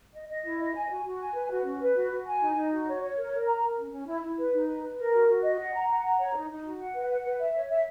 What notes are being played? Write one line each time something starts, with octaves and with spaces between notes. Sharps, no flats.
D#5
D#5
E4
D#5
G#5
F#4
F#4
G#5
B4
F#4
C#4
B4
F#4
F#4
G#5
D#4
D#4
F#4
C#5
C#5
A#4
A#4
A#5
A#4
C#4
C#4
E4
E4
B4
D#4
B4
B4
A#4
F#4
F#4
D#5
F#5
A#5
F#5
A#5
C#5
D#4
D#4
F#4
F#5
B4
F#5
B4
E5
C#5
E5